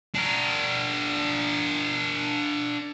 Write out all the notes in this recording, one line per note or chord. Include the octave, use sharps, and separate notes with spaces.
D4 A#4